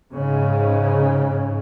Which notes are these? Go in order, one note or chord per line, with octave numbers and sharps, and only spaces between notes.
G#2 C#3